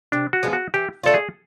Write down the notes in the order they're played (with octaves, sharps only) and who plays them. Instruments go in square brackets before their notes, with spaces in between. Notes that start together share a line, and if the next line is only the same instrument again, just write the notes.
[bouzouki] C3 [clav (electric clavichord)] D4
[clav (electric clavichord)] F#4
[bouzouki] F3 G#3 B3
[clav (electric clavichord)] F#4
[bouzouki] E3 [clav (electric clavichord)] G4
[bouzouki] A3 D4 F4 [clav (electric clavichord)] A4
[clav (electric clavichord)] G#4